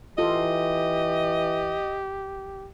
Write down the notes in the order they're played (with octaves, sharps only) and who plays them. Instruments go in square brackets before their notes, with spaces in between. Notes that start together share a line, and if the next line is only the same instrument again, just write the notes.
[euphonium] E3 [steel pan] F4 A4 [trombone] G4 [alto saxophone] D#5